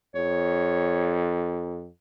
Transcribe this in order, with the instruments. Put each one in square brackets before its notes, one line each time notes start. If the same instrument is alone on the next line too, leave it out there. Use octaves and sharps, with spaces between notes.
[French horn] F2 [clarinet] C#5